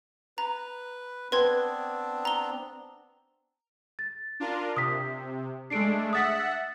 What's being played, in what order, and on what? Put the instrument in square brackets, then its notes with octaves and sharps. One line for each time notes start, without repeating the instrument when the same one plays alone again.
[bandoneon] B4 [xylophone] A#5
[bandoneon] B3 C4 D4 [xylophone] B4 C6 G#6
[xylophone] A#5 G7
[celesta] A6
[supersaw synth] D4 F4 A#4
[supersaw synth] C3 [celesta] D#6 B6
[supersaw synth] G#3 A3 D4 [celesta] C7 D7
[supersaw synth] E5 F#5 [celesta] D#6 A6 B6